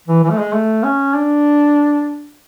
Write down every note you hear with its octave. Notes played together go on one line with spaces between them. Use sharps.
E3
E3
A3
G#3
A3
C#4
D4